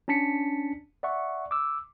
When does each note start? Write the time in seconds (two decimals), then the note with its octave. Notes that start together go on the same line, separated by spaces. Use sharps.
0.08 C#4 D4 A5 B6 C#7
1.03 D5 E5 F#5 C#6
1.51 D6 E6